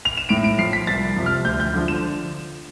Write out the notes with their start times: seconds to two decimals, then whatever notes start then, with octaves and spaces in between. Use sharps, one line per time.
0.05 F7
0.17 E7
0.29 A2 D7
0.44 D7
0.58 F3 C7
0.73 B6
0.87 C2 A6
1.16 C3 F3
1.26 F6
1.45 D2 G6
1.60 G6
1.74 D3 F3
1.88 E7